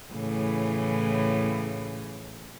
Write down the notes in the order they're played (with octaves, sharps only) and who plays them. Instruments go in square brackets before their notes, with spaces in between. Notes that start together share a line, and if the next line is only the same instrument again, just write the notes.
[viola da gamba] A2 C#3 E3